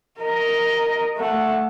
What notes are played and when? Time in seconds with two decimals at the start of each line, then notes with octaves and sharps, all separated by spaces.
0.20 A#4 D#5
1.18 A3 F#5